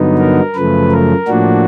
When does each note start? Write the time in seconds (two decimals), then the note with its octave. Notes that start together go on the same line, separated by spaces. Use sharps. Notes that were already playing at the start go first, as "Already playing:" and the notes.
Already playing: G2 D3 F#3 B3 D#4
0.18 A#4
0.55 F#2 C#3 F3 A3 B4
0.92 A#4
1.28 A2 F3 A#3 D4 F#4